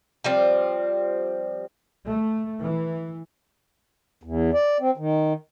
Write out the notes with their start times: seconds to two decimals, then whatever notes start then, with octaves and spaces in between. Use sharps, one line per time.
0.24 F3 G3 C4
2.08 A3
2.63 E3
4.23 E2
4.53 D5
4.80 C4
4.97 D#3